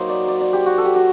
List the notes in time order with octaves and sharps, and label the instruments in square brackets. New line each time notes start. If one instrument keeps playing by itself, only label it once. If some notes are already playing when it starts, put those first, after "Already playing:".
Already playing: [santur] F#3 A#3 D#4 C5
D5
D5
D5
G4
F#4
A4
G4
F#4